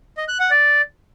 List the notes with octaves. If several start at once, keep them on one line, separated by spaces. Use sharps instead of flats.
D#5
F#6
F#5
D5